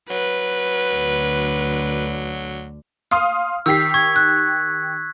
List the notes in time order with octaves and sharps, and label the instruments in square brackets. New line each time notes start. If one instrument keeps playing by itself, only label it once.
[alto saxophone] F#3 [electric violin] B4
[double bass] D2 D3
[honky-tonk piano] F5 C6 D#6 [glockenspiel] F6
[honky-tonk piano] D#3 G4 C7 [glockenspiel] E6 B6
[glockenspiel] C#6 G#6
F#6